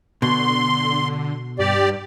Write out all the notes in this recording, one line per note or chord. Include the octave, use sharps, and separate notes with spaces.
B2 D3 C6
G2 G4 D5